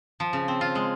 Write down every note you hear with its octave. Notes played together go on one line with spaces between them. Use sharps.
F3
C#3
C4
F4
G#3